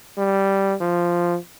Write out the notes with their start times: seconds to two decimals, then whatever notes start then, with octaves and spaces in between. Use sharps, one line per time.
0.17 G3
0.81 F3